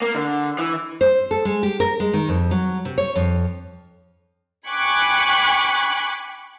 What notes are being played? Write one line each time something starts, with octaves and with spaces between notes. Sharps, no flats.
A#3
D3
E3
C5
A4
G#3
G4
A#4
G#3
D#3
F2
F#3
C3
C#5
F2
G5 G#5 B5 C#6 D6 F#6